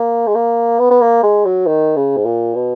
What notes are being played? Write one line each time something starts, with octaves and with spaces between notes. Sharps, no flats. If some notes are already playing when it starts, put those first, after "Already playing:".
Already playing: A#3
G#3
A#3
B3
B3
A#3
G#3
F#3
D#3
C#3
G#2
A#2
B2